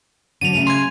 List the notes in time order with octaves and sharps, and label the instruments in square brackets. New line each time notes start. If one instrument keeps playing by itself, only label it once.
[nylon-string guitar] D3 F#3 C4 [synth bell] D#7 F7
[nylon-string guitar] C#3 A3
[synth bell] C6 G#6